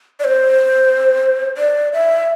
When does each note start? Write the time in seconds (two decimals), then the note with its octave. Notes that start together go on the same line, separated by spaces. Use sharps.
0.20 D5
0.24 C5
1.57 D5
1.93 E5